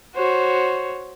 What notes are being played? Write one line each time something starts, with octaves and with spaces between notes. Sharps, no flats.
F#4 C5 C#5